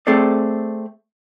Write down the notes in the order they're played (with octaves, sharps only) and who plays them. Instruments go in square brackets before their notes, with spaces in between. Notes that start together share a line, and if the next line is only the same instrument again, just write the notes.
[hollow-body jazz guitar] A3 C4 G#4 A4 D5